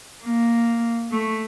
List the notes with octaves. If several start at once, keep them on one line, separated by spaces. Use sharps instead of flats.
A#3
A3